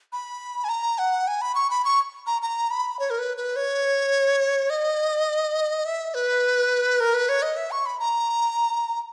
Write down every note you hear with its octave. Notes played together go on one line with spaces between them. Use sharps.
B5
G#5
A#5
F#5
G#5
B5
C#6
B5
C#6
A#5
A#5
B5
C#5
A#4
B4
B4
C#5
D#5
E5
B4
A#4
B4
C#5
D#5
E5
C#6
B5
A#5